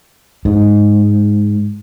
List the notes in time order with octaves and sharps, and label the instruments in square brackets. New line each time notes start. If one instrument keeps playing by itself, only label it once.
[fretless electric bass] G#2